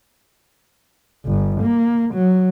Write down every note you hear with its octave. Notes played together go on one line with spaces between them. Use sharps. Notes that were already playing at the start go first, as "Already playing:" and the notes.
G1
A#3
F#3